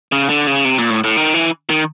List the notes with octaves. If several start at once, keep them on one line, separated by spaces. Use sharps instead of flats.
C#3
D3
C#3
C3
A#2
A2
A2
D#3
E3
D#3